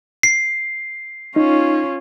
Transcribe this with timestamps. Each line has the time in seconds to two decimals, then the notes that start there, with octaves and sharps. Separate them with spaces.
0.23 C7
1.36 C#4 D#4 F4